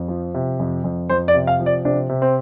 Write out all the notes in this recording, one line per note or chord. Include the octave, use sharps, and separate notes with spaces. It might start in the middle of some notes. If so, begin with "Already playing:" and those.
Already playing: F2
F3
C3
F2
F2
F2 C5
D5
C3
F5
F3
D5
C3 D4
C3
C4